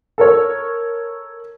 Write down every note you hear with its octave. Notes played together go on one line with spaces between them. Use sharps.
A4 A#4 C#5